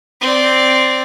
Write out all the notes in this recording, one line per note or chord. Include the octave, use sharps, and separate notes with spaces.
C4 D5